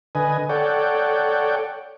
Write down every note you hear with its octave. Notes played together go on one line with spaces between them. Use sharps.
D3 B4 D#5 G#5
A4 C#5 D5 F#5 G5